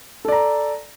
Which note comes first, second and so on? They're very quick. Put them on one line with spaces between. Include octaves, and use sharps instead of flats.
A4 D5 A#5